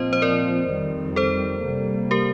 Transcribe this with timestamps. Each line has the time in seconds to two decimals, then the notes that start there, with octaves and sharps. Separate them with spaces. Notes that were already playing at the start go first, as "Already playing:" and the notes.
Already playing: A#2 F3 C4 C5 D#5
0.13 C5
0.22 A#4 D5
0.70 F2 D#3 G3 C4
1.16 A4 C5
1.64 C3 G3 A#3
2.11 G4 A#4